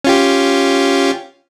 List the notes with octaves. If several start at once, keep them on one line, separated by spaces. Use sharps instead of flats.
C#4 F4 G4